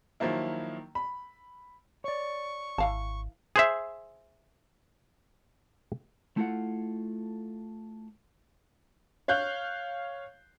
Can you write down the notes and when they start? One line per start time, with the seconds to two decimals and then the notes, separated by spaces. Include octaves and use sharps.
0.20 D#3 F3 F#3 A#3 E4
0.95 B5
2.04 C#5 D5 C#6
2.78 G#1 E3 F5 A5
3.56 G#4 C5 E5
6.37 A3 E4 F4 A4 F#5
9.28 C#5 F5 F#6 G6